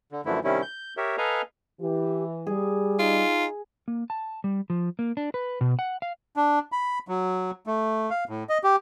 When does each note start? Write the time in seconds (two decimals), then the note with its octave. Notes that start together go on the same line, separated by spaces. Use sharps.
0.12 D3
0.25 F#2 D3 E3 F3 A3 E4
0.44 C3 D#3 G3 C#4 E4
0.62 G6
0.97 G4 A#4 C#5 E5
1.18 A4 B4 D#5 F5 G#5 A#5
1.81 E3 G4
2.47 G3 G#4
2.99 D#4 F4
3.88 A#3
4.10 A5
4.44 G3
4.70 F3
4.99 A#3
5.17 D4
5.34 B4
5.61 B2
5.79 F#5
6.02 F5
6.37 D4
6.72 B5
7.08 F#3
7.67 A3
8.10 F5
8.29 A2
8.49 D#5
8.64 G4